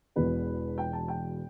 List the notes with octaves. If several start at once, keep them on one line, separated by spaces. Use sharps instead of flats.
E1 E2 B2 B3 B4
G5
A5
G5